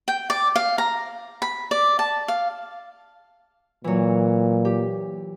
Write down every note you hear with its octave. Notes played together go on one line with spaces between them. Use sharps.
G5
D5
F5
A#5
B5
D5
A5
F5
A#2 E3 F#3
G4